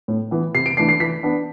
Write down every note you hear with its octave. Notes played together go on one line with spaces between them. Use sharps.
A2
E3 B3
C3 C7
D7
E3 A3 D4 C7
C7
E3 B6
B3 D4